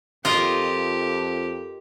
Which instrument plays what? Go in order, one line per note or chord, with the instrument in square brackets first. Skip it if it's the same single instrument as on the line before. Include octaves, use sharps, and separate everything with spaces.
[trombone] F2 [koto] F4 A#4 D#5 [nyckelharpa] G4